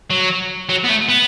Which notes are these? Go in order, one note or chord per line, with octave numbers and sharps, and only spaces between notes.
F#3
F#3
B3
A3
B3